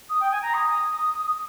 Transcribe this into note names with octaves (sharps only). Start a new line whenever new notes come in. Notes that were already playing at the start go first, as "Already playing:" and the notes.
D#6
G5
G#5
A#5
D#6